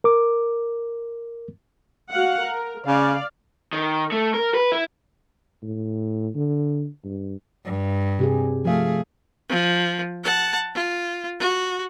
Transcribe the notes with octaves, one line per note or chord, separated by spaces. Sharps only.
A#4 D6
F#4 F5 F#5
A#4
C#3 D5 F5
D#3
A3
A#4
B4
E4
A2
D3
G2
G2
C3 G4 G#4
F3 A3 G#4 F5
F3
F#5 A5
F4
F#4